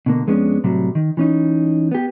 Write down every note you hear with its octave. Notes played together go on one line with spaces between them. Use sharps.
B2 D3 A#3
F2 G#3 B3 C#4 D4
A2 C3 F#3 G3
D#3
E3 C#4 D#4
B3 G4